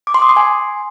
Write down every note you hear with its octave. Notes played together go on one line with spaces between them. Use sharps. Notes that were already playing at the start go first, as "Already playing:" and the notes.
D6
C6
D#6
C6
G#5